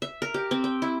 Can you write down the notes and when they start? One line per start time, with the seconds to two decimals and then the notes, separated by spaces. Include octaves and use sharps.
0.02 E5
0.22 A#4
0.34 G4
0.51 C4
0.64 G5
0.82 E4